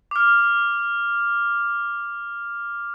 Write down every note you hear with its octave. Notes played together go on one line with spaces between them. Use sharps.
D6 F6